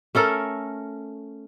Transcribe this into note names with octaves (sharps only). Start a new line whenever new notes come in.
A3 C#4 A4 A#4